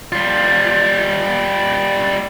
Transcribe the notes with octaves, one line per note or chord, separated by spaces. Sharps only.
G3 F4